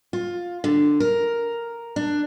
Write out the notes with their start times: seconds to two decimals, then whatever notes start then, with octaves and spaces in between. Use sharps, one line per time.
0.13 F4
0.64 D3
1.00 A#4
1.96 D4